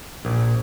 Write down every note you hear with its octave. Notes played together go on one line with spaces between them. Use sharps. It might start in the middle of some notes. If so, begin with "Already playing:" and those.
A#1